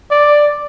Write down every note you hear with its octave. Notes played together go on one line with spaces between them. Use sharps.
D5